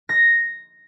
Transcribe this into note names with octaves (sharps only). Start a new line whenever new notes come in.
A#6